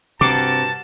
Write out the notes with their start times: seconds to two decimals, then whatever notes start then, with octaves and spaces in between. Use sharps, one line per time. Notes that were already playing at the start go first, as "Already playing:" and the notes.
0.21 G2 C3 F#4 A5 A#5 D6